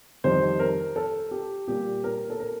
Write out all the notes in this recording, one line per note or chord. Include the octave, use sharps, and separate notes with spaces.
F2 D#3 G3 C5
A#4
A4
G4
A#2 G3 A#3 G4
A#4
A4
A#4